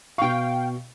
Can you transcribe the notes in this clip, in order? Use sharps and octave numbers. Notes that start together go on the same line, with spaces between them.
B2 F5 G5 C#6